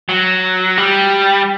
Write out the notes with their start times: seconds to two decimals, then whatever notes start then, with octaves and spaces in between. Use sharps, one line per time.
0.09 F#3
0.78 G3